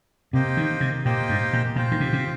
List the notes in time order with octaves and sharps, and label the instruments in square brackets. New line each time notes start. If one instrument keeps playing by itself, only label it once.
[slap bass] C3 [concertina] A#3 G4 C5 D#5 G5
[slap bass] D#3
C3
[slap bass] A#2 [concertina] A#3 G4 C5 D#5 G5
[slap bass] G2
A#2
[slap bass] A#2 [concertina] F4 C5 G5
[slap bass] D#3
C3
C3